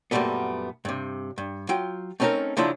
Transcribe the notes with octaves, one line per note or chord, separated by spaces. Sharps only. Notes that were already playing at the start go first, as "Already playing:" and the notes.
F#2 A#2 D#3 G3 A3 B3
G2 C3
G2
F#3 F4 G5
A3 C4 C#4 D#4 A4 A#4
C#3 F3 F#3 D4 E4 F4